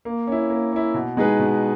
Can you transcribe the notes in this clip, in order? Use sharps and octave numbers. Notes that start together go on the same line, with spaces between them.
A#3
C#4 E4
A#3
C#4 E4
B2
G#3 D#4 G#4 B4
B2